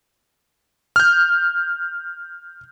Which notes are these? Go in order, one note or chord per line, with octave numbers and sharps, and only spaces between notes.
F6 G6